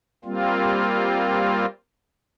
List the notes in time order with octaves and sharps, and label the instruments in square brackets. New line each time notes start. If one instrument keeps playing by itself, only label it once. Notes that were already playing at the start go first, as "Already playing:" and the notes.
[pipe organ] G3 A#3 C4 F4